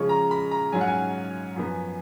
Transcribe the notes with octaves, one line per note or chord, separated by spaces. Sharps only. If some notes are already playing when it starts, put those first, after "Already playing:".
Already playing: C#3 F3 G#3 C#4 C#6
A#5
B5
A#5
G#2 F#3 C#4 F4 G#5
F#5
G#5
F#2 F3 B3